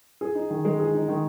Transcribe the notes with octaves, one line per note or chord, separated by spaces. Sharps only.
G#4
D#4
D#3
G#3
G#4
D#4
D#3